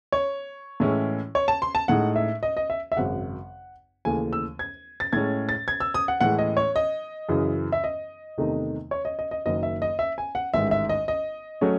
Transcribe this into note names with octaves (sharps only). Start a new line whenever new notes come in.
C#5
A2 E3 G#3 C#4 E4
C#5
A5
C6
A5
A2 G#3 D#4 F#5
E5
D#5
D#5
E5
E5
G#1 F#2 C#3 F#5
D#2 C#3 E3 A3 G#5
E6
G#6
A6
A2 G#3 C#4 G#6
A6
G#6
E6
D#6
F#5
A2 E3 G#3 F#5
D#5
C#5
D#5
F#2 C#3 E3
E5
D#5
E2 C3 D#3 A3 D#4
C#5
D#5
D#5
D#5
F#1 F#2 D#3 D#5
E5
D#5
E5
G#5
F#5
A1 G#2 D#3 E5
E5
D#5
D#5
F#3 A3 C#4